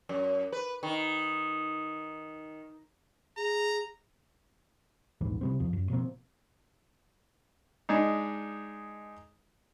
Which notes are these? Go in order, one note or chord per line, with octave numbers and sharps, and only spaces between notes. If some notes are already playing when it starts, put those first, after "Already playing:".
F#2
B4
D#3
G#4 A#5
A#1 D#2 G#2 E3
C3 G3 C4
E2 F3
F#2
B2 F3 A#3 C4
G#3 D4 D#4